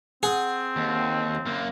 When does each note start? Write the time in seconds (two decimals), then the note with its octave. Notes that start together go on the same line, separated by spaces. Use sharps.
0.23 C4 G#4 F#5
0.76 D#2
1.45 F#2 A#3